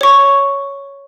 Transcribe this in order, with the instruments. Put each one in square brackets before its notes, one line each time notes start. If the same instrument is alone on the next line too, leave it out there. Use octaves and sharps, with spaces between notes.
[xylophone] C#5 C#6